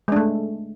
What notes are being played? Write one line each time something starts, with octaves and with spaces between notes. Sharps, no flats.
G#3 A3 D4